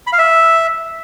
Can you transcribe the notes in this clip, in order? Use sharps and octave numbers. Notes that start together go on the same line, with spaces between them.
B5
F5
E5